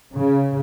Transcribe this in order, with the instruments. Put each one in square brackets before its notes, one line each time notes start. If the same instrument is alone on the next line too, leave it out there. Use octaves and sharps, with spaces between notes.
[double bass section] C#3